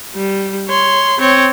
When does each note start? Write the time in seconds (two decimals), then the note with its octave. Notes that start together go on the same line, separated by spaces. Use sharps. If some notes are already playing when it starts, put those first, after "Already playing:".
0.15 G3
0.68 C#5 C6
1.20 C4 C#5